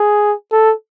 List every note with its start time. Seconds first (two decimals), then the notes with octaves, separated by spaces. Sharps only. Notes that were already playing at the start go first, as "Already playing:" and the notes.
Already playing: G#4
0.52 A4